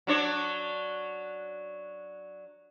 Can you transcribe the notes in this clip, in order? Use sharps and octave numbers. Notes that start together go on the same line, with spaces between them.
F#3 D4 C#5